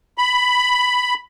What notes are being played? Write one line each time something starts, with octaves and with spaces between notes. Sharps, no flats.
B5